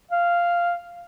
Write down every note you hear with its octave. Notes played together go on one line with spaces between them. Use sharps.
F5